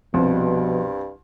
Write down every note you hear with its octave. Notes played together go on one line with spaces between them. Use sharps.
C2 G2 B2 F3